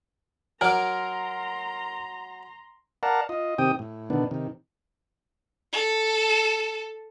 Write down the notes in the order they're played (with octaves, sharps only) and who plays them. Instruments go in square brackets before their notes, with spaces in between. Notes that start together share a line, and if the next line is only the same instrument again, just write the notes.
[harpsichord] F#3 D6 [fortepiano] A#4 [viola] A#5 C6
[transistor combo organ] A#4 D5 F5 F#5 A5 A#5
F4 D#5
C3 D#3 C4 G4 G5 D#6
A2
B2 D3 D#3 B3 D4
C3 D#3
[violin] A4